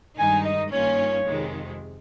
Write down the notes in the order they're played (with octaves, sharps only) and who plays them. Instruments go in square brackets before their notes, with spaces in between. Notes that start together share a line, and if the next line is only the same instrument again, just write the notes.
[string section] G2 D#3 G#3 D#4 [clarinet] G#5
[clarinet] D#5
[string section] G2 D#3 A#3 C#4 F4 [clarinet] C#5
[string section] F2 C3 D#3 G#3